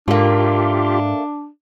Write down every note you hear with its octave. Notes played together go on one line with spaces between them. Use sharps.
G#2 A3 A#3 D4 F4 G4